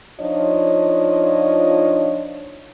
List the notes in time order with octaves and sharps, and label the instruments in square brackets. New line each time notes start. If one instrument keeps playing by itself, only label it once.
[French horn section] F3 D4 D#4 F4 C#5 D#5